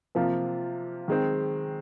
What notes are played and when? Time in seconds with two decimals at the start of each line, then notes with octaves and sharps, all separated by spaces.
0.15 C3 F3 A#3 F4
1.08 D#3 G#3 C4